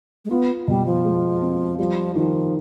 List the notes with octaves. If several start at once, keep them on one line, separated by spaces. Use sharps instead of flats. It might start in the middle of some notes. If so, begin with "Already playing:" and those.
G#3
B3 F4
B2 G3
F3
G#3
C4
F3 G3
D#3 F3